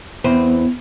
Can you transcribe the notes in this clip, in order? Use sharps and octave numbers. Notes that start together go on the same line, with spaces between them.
E2 B3 C4